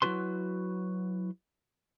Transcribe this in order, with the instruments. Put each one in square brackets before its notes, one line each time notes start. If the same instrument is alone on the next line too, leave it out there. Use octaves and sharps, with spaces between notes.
[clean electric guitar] F#3 D4 E4 F#4 B4 C6